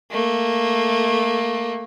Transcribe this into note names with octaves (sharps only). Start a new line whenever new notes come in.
A3 A#3